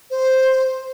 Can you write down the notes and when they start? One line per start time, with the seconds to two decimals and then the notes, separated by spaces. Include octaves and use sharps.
0.11 C5